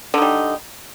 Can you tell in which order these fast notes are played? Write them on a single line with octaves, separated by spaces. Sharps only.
D3 D#4 G3